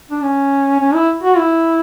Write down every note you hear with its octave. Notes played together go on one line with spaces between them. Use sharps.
D4
C#4
C#4
E4
F#4
E4